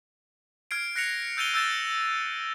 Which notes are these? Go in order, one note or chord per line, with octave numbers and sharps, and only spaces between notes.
F6 G#6 C7 D7
F#6 A#6 C7 C#7 F7
E6 G6 A6 D#7 F7 G7
E6 G6 A6 E7